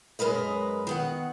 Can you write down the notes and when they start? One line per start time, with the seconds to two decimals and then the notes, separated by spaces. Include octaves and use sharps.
0.19 F#2 G#3 A#4 B4 D#5
0.87 D#3 B3 F#5